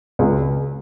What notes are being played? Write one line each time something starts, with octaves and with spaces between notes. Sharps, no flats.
C#2